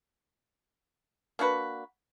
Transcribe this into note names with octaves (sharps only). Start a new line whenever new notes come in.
A#3 D4 F#4 B4